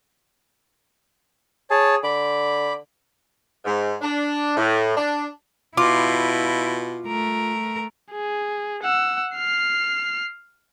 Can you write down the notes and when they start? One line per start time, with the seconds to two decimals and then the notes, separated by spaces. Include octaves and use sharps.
1.70 G#4 C#5 A5
2.04 D3 B5 D6
3.65 G#2
4.01 D4
4.57 A2
4.97 D4
5.77 B2 E4 F4 D6
7.06 A3 A#4
8.11 G#4
8.83 F#5 E6
9.36 F6 C7